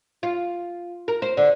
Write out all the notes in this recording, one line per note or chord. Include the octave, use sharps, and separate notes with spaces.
F4
A#4
C5
D3 D5